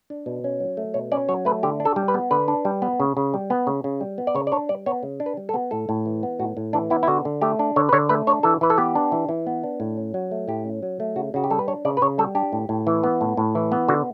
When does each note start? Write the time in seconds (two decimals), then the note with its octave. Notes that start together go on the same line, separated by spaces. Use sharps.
0.10 D4
0.26 B2
0.44 C#4
0.60 F#3
0.77 A3
0.94 B2 C#5
1.12 C#4 D5
1.29 F#3 C#5
1.45 A3 B4
1.63 D3 G4
1.80 D4
1.85 A4
1.96 G3
2.08 B4
2.14 B3
2.31 D3 B4
2.48 D4
2.65 G3
2.82 B3
3.00 C#3
3.17 C#3
3.34 G3
3.50 B3
3.67 C#3
3.84 C#3
4.01 G3
4.18 B3
4.27 D5
4.35 C#3 C#5
4.47 D5
4.52 D4 C#5
4.69 G3 D5
4.86 B3 C#5
5.03 C#3
5.20 D4
5.26 B4
5.37 G3
5.49 A4
5.54 B3
5.71 A2 A4
5.89 A2
6.06 E3
6.23 B3
6.39 A2 F#4
6.57 A2
6.73 E3 D4
6.90 B3 E4
7.03 E4
7.08 D3 F#4
7.25 D3
7.41 A3 G4
7.59 D4
7.76 D3 C#5
7.89 B4
7.93 D3 C#5
8.09 A3 B4
8.27 D4 C#5
8.43 E3 A4
8.61 E3 B4
8.70 A4
8.78 B3 G4
8.95 D4
9.12 E3
9.29 E3
9.47 B3
9.64 D4
9.80 A2
9.97 C#4
10.14 F#3
10.31 A3
10.48 A2 G4
10.65 C#4
10.83 F#3
11.00 A3
11.16 C#3 F#4
11.34 C#3 F#4
11.44 G4
11.50 G3 A4
11.59 B4
11.68 D4 C#5
11.85 C#3 D5
11.97 B4
12.02 C#3 C#5
12.18 G3 A4
12.35 D4 G4
12.53 A2
12.69 A2
12.87 E3
13.03 B3
13.21 A2
13.37 A2
13.55 E3
13.72 B3
13.88 D3 F#4